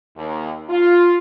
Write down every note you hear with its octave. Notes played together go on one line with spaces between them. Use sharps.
D#2
F4